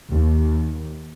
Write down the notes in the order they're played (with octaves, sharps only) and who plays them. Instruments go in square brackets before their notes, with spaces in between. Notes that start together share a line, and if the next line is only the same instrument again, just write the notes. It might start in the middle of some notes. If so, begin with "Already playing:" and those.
[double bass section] D#2